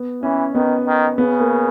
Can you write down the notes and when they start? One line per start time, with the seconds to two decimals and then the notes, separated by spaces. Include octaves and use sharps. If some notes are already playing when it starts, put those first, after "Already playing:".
Already playing: B3
0.23 E3 C#4
0.55 D#3 B3
0.86 D#3
1.18 C#3 B3
1.40 A#3